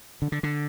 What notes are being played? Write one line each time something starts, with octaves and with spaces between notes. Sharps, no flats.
D3
D3
D3